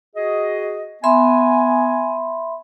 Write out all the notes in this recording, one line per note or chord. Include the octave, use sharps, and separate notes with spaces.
F#4 G#4 D#5
B3 E5 G#5 B5 C6